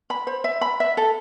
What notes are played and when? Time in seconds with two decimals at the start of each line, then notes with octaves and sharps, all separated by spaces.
0.10 B5
0.27 C5
0.44 E5
0.61 B5
0.80 E5
0.97 A4